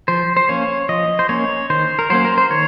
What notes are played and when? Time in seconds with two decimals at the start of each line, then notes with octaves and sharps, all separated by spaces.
0.08 F3 C5
0.37 C5
0.49 A#3 C#4 C#5
0.89 F3 D#5
1.19 C5
1.29 A#3 C#4 C#5
1.70 D#3 C5
1.99 A#4
2.10 F#3 A#3 C#4 C5
2.25 A#4
2.38 C5
2.50 D#3 C#5